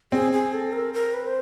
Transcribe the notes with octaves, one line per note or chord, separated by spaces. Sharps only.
C4 G#4
G#4
A4
A#4
A#4
B4
C5